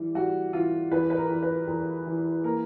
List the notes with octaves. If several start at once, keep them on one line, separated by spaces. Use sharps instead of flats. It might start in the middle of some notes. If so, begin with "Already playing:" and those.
Already playing: E3 G3
G3 F#4
E3 F4
E2 B4
B4
A#4
E2
B4
E2 A#4
E3
A#3 A#4